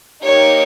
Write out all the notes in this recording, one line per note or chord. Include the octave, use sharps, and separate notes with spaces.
A#3 D#4 G4 C#5